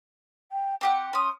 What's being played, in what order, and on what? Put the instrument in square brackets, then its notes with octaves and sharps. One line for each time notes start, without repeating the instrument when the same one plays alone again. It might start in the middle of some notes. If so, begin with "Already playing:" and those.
[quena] G5
[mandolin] C4 G4 F#5 [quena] D6
[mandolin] C#4 D#6 [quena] C6